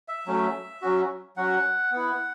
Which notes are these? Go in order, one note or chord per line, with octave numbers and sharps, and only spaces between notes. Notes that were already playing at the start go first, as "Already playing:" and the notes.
E5
F#3 A3 C#4
F#3 C#4 F#4
F#3 C#4 F#4 F#5
B3 E4